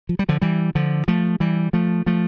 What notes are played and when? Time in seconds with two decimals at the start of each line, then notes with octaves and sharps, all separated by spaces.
0.09 F3
0.19 G3
0.29 D3 F3
0.41 E3 G3
0.75 D3 F3
1.08 F3 A3
1.40 E3 G3
1.73 F3 A3
2.06 F3 A3